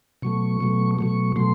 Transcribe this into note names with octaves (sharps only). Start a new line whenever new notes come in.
B2 F#3 A3 C#6
B2 F#3 A3
B2 F#3 A3 C#6
B2 F#3 A3 C6